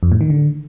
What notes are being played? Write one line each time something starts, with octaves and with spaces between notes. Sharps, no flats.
F2
A2
D#3
D3